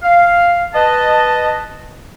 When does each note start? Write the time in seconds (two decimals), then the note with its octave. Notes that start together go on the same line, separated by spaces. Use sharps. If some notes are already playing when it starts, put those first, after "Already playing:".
0.03 F5
0.74 B4 D#5 A5